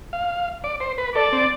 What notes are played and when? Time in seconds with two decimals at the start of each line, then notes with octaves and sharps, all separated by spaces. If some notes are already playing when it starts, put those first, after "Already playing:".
0.13 F5
0.64 D5
0.80 C5
0.98 B4
1.15 A4 D5
1.33 C4